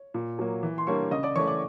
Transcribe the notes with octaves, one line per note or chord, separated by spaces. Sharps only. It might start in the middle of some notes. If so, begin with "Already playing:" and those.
Already playing: C#5
A#2
F#3 A#3
E3
C6
G3 A#3 D4 C#5 C#6
C#3 D#5 D#6
D5 D6
E3 A3 C#5 C#6
D5 D6